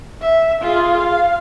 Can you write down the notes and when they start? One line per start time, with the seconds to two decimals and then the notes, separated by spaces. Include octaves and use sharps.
0.21 E5
0.61 F4 G#4
0.97 F5